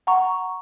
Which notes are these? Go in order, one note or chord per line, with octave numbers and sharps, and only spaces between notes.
F#5 A#5 C#6